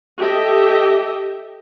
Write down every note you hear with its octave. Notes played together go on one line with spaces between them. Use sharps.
G4 A4 D#5 E5